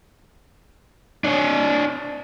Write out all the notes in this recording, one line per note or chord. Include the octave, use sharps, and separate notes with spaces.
D4 C#5